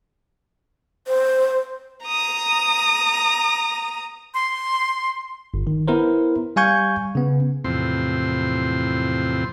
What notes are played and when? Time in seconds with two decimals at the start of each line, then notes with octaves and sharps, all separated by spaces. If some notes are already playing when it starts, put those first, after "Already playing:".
1.07 C5
2.05 A#5 D#6
4.34 C6
5.54 G1
5.67 D#3
5.88 B3 E4 A#4 C5
6.56 G3 F5 G#5 C#6 G6 G#6
7.15 C#3 B3
7.64 E2 A2 C3 F3 C4 C6